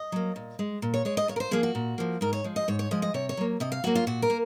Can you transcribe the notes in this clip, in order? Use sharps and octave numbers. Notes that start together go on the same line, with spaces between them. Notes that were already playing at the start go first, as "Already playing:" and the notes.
Already playing: D#5
F#3 A#3
A#2
G#3
A#2
C#5
G#3 C#5
D#5
A#2 C#5
A#4
C5
F3 A#3 G#4
F#4
A#2
F3 A#3
G#2 A#4
C#5
F3 G#3
D#5
G#2 C#5
C#5
F3 G#3 D#5
D#5
C3 C#5
C#5
F#3 A#3
C3 D#5
F5
F#3 A#3 F#4
F4
A#2 F#4
A#4
A#3